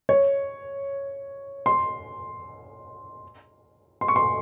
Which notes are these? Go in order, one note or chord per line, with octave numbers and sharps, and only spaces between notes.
C#5
C6
C6
C#6
C6